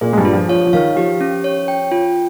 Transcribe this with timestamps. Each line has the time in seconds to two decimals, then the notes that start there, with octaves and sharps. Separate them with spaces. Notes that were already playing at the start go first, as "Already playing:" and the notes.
0.01 A#2 A#3 G#4
0.13 G#3
0.17 G2 G3
0.25 F4
0.33 F3
0.49 F3 C#5
0.67 F3
0.73 D#3 F5
0.96 F3 G4
1.21 C#4
1.44 C#5
1.68 G5
1.92 F4